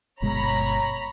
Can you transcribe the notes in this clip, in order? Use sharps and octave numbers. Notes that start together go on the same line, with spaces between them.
G1 B2 G#3 C#5 A#5 B5